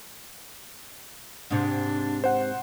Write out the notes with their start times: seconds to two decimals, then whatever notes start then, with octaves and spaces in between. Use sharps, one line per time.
1.51 G#2 C3 D4
2.24 C5 F#5